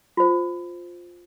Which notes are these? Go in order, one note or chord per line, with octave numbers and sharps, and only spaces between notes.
F4 C5